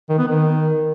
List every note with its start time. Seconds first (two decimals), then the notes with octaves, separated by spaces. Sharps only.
0.09 D#3
0.18 B3
0.27 D#3